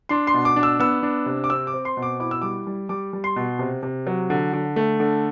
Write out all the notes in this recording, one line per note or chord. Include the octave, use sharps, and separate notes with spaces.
D4 C6
C6
B2
D6
D4
E6
B3 E6
D4
C3
D6
C4 E6
D6
C4
C6
B2
D6
E4 D6
E6
G3 D6
G3
G3 D6
G3
C6
B2
C3
C3
F#3
D3
D3
A3
D3